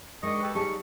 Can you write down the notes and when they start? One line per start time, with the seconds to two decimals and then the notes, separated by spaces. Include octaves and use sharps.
0.23 D#3 G#3 D4 D#5 C#6
0.41 G4 A4 B4
0.55 C#3 G3 D#4 G4 A5 C#6